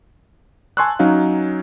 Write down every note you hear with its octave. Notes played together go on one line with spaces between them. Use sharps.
G#5 A5 C6 C#6 E6 F#6
F#3 C#4 D#4 F5